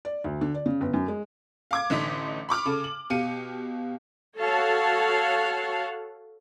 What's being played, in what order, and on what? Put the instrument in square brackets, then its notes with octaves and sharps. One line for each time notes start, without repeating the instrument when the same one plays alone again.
[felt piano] D5
D2
D3
D5
C#3
G1
F#2
G#3
[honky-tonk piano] F5 D6 G#6
A1 D3 D#4 B6
B5 C#6 D6 F6
C#3 A4
F#7
B2 G4 F5 C#7 D#7
[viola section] F#4 A4 C#5 F5 F#5 A5